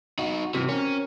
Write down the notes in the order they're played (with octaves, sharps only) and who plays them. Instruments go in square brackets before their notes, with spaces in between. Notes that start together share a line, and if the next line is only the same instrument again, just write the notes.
[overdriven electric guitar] D#4 F#4
[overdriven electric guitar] C3 E3 [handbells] C4 F#4
[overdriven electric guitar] C#4 [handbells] A#4